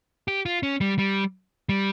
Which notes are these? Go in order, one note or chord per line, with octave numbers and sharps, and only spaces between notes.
G4
F4
C#4
G3
G3
G3